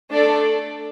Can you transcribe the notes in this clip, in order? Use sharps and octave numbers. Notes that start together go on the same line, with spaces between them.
A3 D4 A4 D5